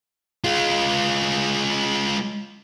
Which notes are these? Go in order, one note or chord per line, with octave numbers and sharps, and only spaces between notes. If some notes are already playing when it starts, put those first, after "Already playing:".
G#3 F4